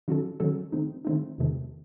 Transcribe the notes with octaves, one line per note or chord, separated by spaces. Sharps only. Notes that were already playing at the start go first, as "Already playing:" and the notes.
D#3 F#3 C#4 F#4 A4
D#3 F#3 C#4 F#4 A4
D#3 A3 C4 D#4
D#3 A3 C4 D#4
E2 C3 D#3 A3